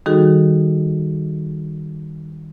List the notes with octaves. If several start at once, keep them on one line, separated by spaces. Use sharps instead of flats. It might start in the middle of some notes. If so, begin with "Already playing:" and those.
D#3 G3 D#4 F#4 G#4 A4